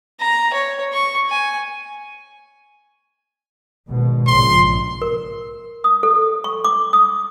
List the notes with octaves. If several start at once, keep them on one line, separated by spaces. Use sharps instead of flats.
A#5
C#5
C#6
G#5
G#1 B2
A#1 G#2 C#3 C6
A#4
D#6
A4
C#6
D6
D#6